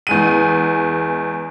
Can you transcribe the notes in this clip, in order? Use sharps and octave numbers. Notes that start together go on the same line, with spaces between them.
E2 G#3 D#7